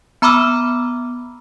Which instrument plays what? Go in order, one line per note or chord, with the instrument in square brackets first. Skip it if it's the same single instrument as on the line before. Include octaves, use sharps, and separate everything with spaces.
[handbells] B3 A#5 B5 D6 E6 F6